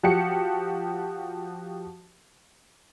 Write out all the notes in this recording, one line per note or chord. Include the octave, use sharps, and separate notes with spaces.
F3 F#4 G4 C#7